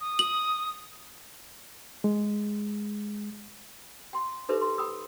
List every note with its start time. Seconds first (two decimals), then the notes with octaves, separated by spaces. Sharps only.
0.01 D#6
0.19 F#7
2.04 G#3
4.13 G5 C6
4.49 D#4 G4 A4 B4 C5 E5
4.61 C6
4.78 G5 B5 D#6 E6